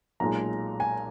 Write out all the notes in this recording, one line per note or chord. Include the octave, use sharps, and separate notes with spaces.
B1 A#2 G#3 A#5
G#5